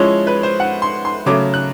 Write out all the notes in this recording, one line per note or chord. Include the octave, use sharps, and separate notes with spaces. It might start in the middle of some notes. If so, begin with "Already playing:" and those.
Already playing: F3 G#3 C#4 E4 C#5
B4
C5
F#5
C6
C6
C#3 F#3 A3 D6
F#6